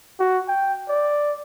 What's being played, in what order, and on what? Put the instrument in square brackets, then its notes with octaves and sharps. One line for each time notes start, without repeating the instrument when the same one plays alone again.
[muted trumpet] F#4
G5
D5